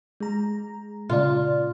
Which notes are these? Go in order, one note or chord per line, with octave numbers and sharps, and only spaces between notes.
G#3 A#5
A#2 C#3 F4 D5